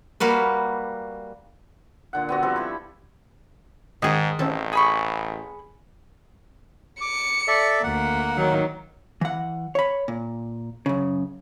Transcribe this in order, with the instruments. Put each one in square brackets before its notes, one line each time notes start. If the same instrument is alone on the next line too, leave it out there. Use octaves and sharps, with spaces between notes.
[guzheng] G3 A#3 F#4 B4
[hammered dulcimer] A#2 D3 F#5
B3 C4 F#4
F3 G3 C4 A4
E4 B5 C#6
[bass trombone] G#2 [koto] D#3 G#4 [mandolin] D#5
[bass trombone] A1 [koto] C4 C#4 A4
[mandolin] G#4 B5 C#6
[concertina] D6 [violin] C#7
[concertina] A4 D5 E5
[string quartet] D2 [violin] A#3 [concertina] F#5
[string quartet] D#3 F#3 D#4
[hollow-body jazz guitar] E3 F#5
C#5 B5
A#2
F#2 C#3